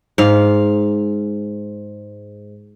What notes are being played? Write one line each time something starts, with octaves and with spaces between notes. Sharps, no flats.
G#2 F5